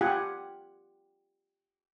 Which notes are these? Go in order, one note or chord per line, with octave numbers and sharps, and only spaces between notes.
F4 G4 F#5 G#5